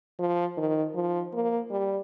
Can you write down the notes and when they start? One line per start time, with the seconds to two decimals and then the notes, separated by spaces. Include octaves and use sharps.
0.19 F3
0.57 D#3
0.95 F3
1.33 A#3
1.71 G3